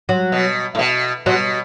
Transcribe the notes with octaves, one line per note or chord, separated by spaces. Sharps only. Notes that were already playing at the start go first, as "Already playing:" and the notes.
F#3
B2
A2
B2
B2 F#3